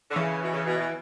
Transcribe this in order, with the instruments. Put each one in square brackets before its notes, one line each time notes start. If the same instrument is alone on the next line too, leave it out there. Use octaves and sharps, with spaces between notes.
[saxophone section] D3
[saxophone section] C#3 [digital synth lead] E3
[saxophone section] B2
C#3
B2
B2